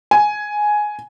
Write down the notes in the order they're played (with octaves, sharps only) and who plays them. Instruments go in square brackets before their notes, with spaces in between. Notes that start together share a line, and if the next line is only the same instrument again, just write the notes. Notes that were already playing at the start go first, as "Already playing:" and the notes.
[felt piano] G#5